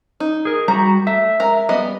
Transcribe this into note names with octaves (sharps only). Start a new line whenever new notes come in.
D#4
G#4 A#4
G3 F#4 A#5
A3 E5
G#3 A#4 A#5
G3 B3 D#5